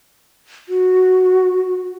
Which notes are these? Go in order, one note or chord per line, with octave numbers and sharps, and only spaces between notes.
F#4